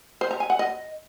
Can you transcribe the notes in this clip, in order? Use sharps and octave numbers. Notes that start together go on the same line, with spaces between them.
C5
A#5
G#5
F#5
D#5